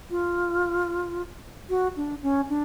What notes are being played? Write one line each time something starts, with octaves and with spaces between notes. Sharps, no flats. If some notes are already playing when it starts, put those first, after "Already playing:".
F4
F#4
D4
C#4
D4